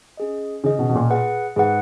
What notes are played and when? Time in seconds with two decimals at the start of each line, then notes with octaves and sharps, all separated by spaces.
0.17 C#4 G#4 D#5
0.64 C#3 C#4 G#4 D#5
0.79 B2
0.89 B2
0.95 A#2
1.10 G#4 B4 F#5
1.56 G#2 G#4 B4 F#5